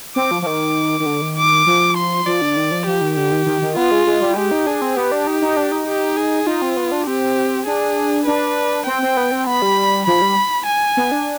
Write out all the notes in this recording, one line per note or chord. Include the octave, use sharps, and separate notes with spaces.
C4 D6
F3
F3
D#3 D6
D#3
D3
D#3
D6
F3
C6
F3 D5
D3
D#3
F3
F3 G4
D#3
D3 G4
D#3
D#3
D#3
B3 F4
G#3
G#3
G3
G#3 G4
D#4
D4 G#4
C4
B3 G4
D4
D#4
D#4
D4
D#4
G4
G#4
D#4 F4
C4
B3
D4
C4 G4
D4 G#4
D4 B4
C4 G5
C4
B3
C4
B3 B5
G3
F3 B5
G3
G#5
B3
D4